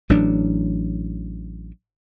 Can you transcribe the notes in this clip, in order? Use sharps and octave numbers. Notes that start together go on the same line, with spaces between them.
A1 E3 F#3 D4